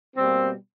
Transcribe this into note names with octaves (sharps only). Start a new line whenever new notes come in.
B2 G3 A#3 C4